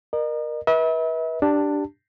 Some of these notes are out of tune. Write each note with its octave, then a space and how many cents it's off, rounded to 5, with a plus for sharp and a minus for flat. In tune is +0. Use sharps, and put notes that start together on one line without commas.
A#4 +15 D#5 -40
B4 -30 E5 -40
D4 +0 G4 +0 A5 +15